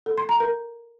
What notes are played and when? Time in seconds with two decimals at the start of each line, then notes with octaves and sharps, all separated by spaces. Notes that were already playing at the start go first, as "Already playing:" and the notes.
0.06 A4
0.18 C6
0.29 A#5
0.40 A#4